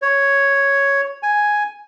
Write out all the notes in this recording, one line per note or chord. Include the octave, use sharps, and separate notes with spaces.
C#5
G#5